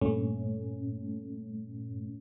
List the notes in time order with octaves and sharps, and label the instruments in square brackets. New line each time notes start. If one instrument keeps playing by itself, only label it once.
[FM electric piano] G2 A#2 A3 C#4